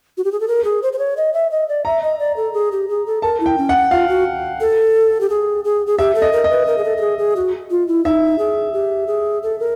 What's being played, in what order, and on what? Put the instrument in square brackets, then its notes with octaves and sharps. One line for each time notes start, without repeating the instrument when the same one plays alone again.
[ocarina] F#4
G4
G#4
A4
A#4
G#4
C5
C5
C#5
D#5
E5
D#5
D5
[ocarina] E5 [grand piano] A#5
[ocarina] D#5
D5
A4
G#4
G4
G#4
A4
[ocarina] A#4 [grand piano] A5
[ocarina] E4
[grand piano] G5
[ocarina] C#4
[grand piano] F#5
[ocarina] F4 [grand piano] F5
[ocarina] F#4
A4
G4
G#4
G#4
G#4
[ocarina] G4 [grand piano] E5
[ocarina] A4
[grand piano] D#5
[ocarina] A#4
[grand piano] D#5
[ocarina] B4
A#4
G#4
A4
A4
G#4
G#4
F#4
F4
E4
[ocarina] D#4 [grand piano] E5
[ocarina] G#4
G4
G#4
A4
A#4